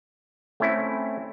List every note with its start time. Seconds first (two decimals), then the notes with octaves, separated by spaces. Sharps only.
0.60 A3 C4 C#4 E4